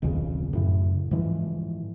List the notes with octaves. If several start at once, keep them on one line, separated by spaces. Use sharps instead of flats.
D#1 B1 F2 C#3
F#2 A2 C#3
G#2 E3 F3